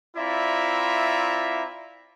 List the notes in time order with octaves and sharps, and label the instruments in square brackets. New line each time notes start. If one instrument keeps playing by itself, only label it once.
[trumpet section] C4 E4 F4 D5 E5 A#5